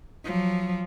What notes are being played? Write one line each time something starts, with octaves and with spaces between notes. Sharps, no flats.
F3 F#3